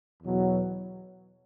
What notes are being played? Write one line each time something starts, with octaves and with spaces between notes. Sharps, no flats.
E2 B2 F#3